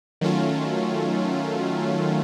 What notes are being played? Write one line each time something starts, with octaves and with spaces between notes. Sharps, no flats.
D#3 F#3 A3 C#4 F4